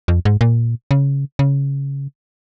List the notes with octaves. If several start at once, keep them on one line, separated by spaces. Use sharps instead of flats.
F2
G#2
A#2
C#3
C#3